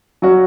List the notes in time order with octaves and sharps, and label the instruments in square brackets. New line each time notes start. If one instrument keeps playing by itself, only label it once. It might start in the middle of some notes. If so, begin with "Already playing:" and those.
[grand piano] F#3 C#4 F#4